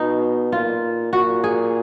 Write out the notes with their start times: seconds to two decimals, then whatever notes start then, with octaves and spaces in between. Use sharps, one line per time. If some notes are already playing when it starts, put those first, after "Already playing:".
Already playing: B2 D#4
0.52 A#2 F4
1.13 A#2 F#4
1.44 G#4